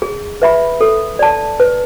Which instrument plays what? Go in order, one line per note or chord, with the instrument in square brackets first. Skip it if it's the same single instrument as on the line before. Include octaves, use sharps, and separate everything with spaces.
[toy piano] G#4
B4 E5 B5
A4
D5 A5
B4